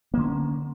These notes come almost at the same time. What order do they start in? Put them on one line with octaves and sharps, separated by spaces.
A#3 D3 C#4